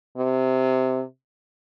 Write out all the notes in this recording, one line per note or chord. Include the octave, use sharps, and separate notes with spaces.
C3